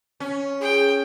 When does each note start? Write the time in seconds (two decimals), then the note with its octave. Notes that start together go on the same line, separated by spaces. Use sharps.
0.20 C#4
0.61 G#4 G5